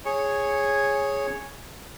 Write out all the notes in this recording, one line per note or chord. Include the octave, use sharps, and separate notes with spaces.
G#4 C#5